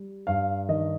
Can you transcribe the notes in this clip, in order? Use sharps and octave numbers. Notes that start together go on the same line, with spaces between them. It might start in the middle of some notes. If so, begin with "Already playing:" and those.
Already playing: G3
G2 F5
D#3 D#5